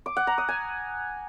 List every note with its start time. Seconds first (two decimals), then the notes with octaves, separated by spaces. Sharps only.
0.06 D6
0.16 F#5
0.27 A#5
0.38 D#6
0.48 G#5